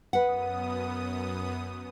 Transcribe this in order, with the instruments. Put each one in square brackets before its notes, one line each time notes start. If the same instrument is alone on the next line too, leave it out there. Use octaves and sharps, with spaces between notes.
[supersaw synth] F#2 B3 D#6 [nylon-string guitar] B4 F#5